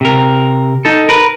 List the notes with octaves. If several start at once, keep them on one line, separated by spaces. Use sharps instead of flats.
C3 A#4
D#4 A4
A#4 B4